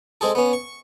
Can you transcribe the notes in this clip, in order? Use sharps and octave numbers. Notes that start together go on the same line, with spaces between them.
G#3 C4 G#4 A4
B3 C#4
C#6